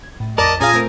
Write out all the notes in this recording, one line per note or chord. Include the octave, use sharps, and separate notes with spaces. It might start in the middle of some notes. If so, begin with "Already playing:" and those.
G#6
A2
A#1 F2 A#4 D5 D#5 A5 D6 B6
A#2 C#4 F4 G#4 F5 G#5 A#5 D#6
A3 C4 A#4